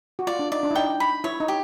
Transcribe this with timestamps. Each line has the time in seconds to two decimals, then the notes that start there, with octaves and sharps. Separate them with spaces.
0.19 F#4
0.27 F4 D5
0.39 D4
0.52 D#4 D5
0.63 D4
0.71 E4
0.75 D#4 G5
1.00 B5
1.24 E4 C#5
1.40 D#4
1.48 G4